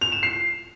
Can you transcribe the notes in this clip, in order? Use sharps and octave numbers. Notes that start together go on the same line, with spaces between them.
F7
E7
C7